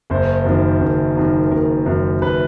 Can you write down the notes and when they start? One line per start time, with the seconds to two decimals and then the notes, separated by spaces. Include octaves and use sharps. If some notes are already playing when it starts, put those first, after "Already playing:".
0.10 F#1 C5
0.45 F#2 D#3
0.81 F#1
1.16 F#2 D#3
1.51 F#1 A#4
1.86 F#2 D#3
2.22 F#1 B4